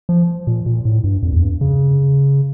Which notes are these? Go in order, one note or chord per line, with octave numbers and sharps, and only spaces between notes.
F3
A#2
A#2
A2
G2
F2
E2
G2
C#3